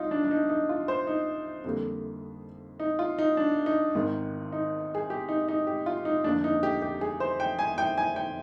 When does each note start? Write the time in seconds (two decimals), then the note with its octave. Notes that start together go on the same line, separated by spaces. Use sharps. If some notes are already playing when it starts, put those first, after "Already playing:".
Already playing: C2 C3 D#4 F4
0.11 D4
0.25 D4
0.31 D#4
0.49 D#4
0.69 F4
0.88 C5
1.07 D#4
1.64 F2 D3 G3 A#3
2.80 D#4
2.99 F4
3.19 D#4
3.37 D4
3.66 D#4
3.95 G#1 G#2 D#3
4.52 D#4
4.95 G#4
5.10 G4
5.29 D#4
5.48 D#4
5.67 G4
5.86 F4
6.05 D#4
6.24 F1 D#2 D3 D4
6.44 D#4
6.63 G4
6.82 G4
7.01 G#4
7.20 C5
7.40 G5
7.59 G#5
7.78 G5
7.98 G#5
8.16 G5